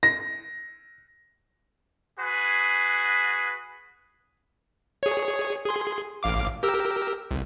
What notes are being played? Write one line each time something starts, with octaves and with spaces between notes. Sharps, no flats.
A#6
F#4 G#4 B4
G#4 C#5
G#4 C6
A1 F5 D6
G4 A#4 E6
C2